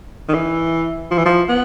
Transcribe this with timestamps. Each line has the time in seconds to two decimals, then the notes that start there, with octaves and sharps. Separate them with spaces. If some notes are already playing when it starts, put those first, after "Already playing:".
0.29 D#3
0.34 E3
1.11 F3
1.18 E3
1.26 F3
1.49 B3